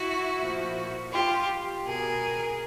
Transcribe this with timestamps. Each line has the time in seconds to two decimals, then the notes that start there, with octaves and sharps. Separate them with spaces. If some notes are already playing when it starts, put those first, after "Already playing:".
Already playing: E4 F#4
0.39 A#2 F3
1.12 F4 G4
1.86 B2 G#4 A#4